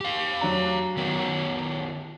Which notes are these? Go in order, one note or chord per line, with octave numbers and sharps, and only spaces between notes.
G4 F5
F#3 D4 A#5
D#3 B3 C#5